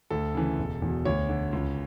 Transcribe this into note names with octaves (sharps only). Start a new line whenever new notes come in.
D2 A4
C#3 E3
E1
E2 B2
D2 C#5
D3
C#2